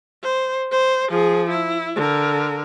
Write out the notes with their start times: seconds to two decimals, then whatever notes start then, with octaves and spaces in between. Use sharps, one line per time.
0.23 C5
0.72 C5
1.10 F3 G#4
1.50 E4
1.96 D3 A#4